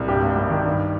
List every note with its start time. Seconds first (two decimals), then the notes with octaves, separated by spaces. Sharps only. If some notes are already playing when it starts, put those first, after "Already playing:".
Already playing: C2
0.08 G2 G4
0.22 G#1
0.36 G#1
0.50 D#3
0.65 G2